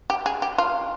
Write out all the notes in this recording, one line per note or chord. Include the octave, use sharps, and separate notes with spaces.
G4
G#4
G4
F4